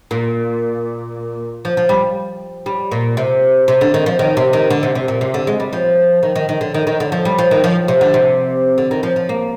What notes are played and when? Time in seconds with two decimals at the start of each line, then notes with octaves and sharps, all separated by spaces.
0.11 A#2
1.65 F3
1.77 F3
1.89 G3
2.66 G3
2.91 A#2
3.17 C3
3.68 C3
3.81 D3
3.94 D#3
4.06 F3
4.19 D#3
4.37 C3
4.53 D#3
4.70 D3
4.83 C3
4.95 C3
5.08 A#2
5.21 C3
5.34 D3
5.47 G#3
5.60 G3
5.73 F3
6.23 D#3
6.36 D#3
6.49 D#3
6.61 D3
6.74 D#3
6.87 D#3
7.00 D3
7.12 F3
7.25 G3
7.38 F3
7.51 D#3
7.64 F3
7.88 C3
8.01 D3
8.14 C3
8.78 D3
8.91 D#3
9.03 F3
9.16 F3
9.29 A#3